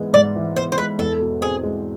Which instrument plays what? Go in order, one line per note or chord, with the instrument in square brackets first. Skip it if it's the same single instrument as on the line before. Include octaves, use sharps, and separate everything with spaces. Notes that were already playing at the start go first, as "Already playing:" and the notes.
Already playing: [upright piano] G#2 E3 G#3 B3
[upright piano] G#2 [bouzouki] D5
[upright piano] E3
[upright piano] B3 [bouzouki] C5
[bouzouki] C5
[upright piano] G#3 [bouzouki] B4
[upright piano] E2 [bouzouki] A4
[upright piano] B2
[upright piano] C4 [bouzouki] G#4
[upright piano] G#3